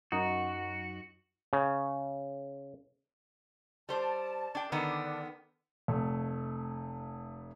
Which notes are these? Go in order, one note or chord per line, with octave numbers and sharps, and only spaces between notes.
F#2 D#4 F#4
C#3
G3 C5 D5 A5
D4 G5
D3 D#3 B3 D4
F1 A3